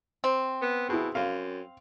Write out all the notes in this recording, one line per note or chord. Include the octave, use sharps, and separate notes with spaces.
C4
B3
B2 E4 G#4
F#2 F5